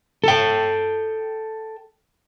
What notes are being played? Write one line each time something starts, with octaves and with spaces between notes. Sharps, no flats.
A4 G5